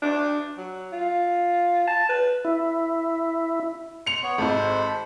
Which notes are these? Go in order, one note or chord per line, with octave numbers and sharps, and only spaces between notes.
D4
F#3
F4
A5
B4
E4
C6 C#7 F7
B3 C#5
G#1 G#2 A4 C5 B5